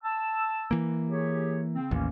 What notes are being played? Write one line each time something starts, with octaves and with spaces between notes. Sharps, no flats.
A5 E6
E3 A#3
G4 G#4 C#5
C#3 C4
A1 D#2 A#3 C#4